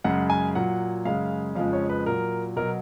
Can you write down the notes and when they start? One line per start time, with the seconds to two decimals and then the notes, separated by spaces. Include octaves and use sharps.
0.04 F#2 C#3 G#3 F#5
0.30 G#5
0.55 A#2 F#3 F#5
1.05 F#2 C#3 G#3 F5
1.55 F2 C#3 F3 G#3 F5
1.73 C#5
1.89 B4
2.06 A#2 F#3 A#4
2.56 B2 F#3 A#4